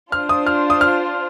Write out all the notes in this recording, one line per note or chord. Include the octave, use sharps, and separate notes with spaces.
D4 F4 C5 F6
D#6
F6
D#6
F6